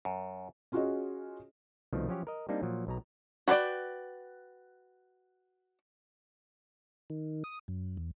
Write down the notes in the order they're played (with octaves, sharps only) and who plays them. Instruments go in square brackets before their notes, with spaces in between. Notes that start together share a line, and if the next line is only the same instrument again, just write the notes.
[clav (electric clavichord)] F#2
[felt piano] C#4 F4 F#4 G#4 C#5 D#5
[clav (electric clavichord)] C2 B2 D#3 F3 A3
F3 F#3 C#4 G4 C#5
A#4 D#5
G3 A#3 C4 D4 D#4
A#2 F3 F#3
B1 B2 A#5
[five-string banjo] F#4 B4 C5 D5 G5
[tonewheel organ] D#3
D#6
F#2
E2